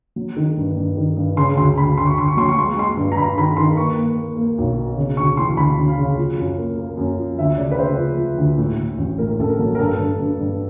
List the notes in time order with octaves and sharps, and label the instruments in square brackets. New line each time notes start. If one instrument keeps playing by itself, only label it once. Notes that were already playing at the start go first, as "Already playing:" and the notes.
[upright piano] F#3
D#3
G2
G2
D#3
G2
C#3 C6
D2 C6
D2 B5
D2 C6
C#6
D2 C6
C#6
F#3 C6
C#6
G#3 C6
C#6
G#3 C6
G2
A#5
G2 B5
D#3 B5
D#3 C6
A#3 C#6
A#3
A#3
A#3
B1
B2
C#3
D2 C#6
E3 C6
D2 B5
D2
F5
C#3
F3
F#2
A#3
A#3
F#2
F3
D2 E5
C#3 D5
B4
C#3 C5
F3
F3
D2
A2
A2
A1
A2 A#4
A1 A4
A#4
F#3
A#4
G2 A4
G2
G2
G2